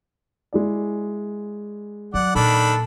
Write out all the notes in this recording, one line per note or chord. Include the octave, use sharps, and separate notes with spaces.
G#3 E4 D5
F#3 D5 F#5
A#2 D#3 D4 A4 B5